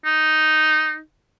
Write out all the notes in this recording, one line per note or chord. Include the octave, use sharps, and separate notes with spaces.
D#4